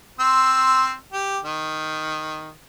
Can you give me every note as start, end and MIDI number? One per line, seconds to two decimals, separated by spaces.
0.20 0.94 60
0.20 0.94 84
0.20 0.94 88
1.13 1.38 67
1.44 2.53 51